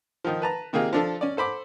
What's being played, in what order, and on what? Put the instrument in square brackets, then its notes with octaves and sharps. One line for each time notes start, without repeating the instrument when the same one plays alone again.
[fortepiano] D#3 F3
B4 A5 A#5
C3 D#3 A#3 F4 G#4
F3 D4 A4
C#4 D5
A4 C5 B5 D6